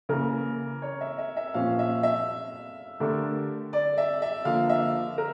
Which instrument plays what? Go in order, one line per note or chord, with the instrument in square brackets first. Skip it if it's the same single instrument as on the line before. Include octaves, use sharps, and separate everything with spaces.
[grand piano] C#3 E3 A#3 [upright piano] A#4
[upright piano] C#5
E5
E5
E5
[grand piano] A#2 F3 C#4 [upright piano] F5
[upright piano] E5
E5
[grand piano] D3 A3 D4 G4 A#4
[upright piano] D5
E5
E5
[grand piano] D3 F3 A#3 [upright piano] F5
[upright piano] E5
A#4